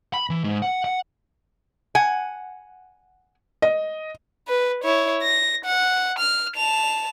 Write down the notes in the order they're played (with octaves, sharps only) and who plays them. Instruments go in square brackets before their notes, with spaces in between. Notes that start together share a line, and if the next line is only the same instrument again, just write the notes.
[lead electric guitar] B5
E3
G#2
F#5
F#5
[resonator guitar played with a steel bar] F#5 G#5
[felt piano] D#5
[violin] B4
E4 C#5
A#6
F#5
F6
A5 F7